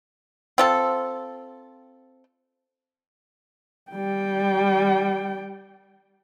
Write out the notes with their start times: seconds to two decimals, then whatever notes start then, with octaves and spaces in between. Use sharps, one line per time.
0.58 C4 F4 A4
3.92 G3 G5